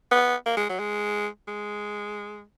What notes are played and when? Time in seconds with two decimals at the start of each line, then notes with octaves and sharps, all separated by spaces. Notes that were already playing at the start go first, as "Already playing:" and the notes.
0.11 B3
0.46 A#3
0.57 G#3
0.69 F#3
0.79 G#3
1.48 G#3